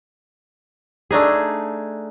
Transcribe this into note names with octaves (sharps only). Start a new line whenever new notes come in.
A3 D4 D#4 G#4